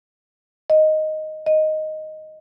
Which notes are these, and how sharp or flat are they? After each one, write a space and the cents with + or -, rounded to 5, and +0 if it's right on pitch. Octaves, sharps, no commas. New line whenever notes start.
D#5 +0
D#5 +0